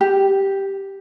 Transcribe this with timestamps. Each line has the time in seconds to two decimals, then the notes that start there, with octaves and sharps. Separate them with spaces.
0.01 G4